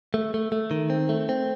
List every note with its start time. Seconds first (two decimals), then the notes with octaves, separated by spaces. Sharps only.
0.14 A3
0.34 A3
0.52 A3
0.71 D#3
0.90 C4
1.09 A3
1.29 C4